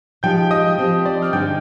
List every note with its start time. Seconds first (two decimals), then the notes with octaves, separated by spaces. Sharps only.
0.23 F3 G#3 D#4 G4 G5 G6
0.51 D#5 D#6
0.78 F3 C4 G4 C5
1.06 D5 D6
1.22 F6
1.33 G2 D3 G#3 D#4 G#4 G5 G6